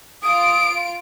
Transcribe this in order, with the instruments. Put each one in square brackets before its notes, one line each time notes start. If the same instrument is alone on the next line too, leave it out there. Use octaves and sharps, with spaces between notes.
[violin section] F4 D7 [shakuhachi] D#6